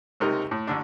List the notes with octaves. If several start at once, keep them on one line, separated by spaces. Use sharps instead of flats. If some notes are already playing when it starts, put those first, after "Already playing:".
C#2 C3 D#4 A#4
A2
A1 D3 D4